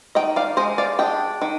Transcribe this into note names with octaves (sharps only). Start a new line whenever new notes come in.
D#3 D#5 G5
D5 F5
G#3 C5 D#5
D5 F5
D4 D#5 G5
D#3